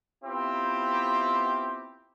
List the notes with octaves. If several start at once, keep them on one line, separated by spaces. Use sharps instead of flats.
B3 C4 E4 F4 G4